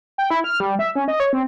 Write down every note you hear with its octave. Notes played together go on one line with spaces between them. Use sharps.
G5
E4
F6
G3
E5
C#4
D#5
C#5
C4